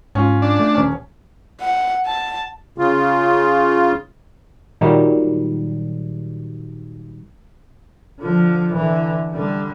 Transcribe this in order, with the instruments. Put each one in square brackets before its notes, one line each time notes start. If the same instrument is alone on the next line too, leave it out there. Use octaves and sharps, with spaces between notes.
[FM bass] G#2 [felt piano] C#4 F4
[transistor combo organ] D4
[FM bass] A3
[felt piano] D#1 C#4
[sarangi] F#5
A5
[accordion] C#3 F4
[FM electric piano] A#2 D#3 F#3 G3
[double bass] D3 F3
D3 E3
D3 G3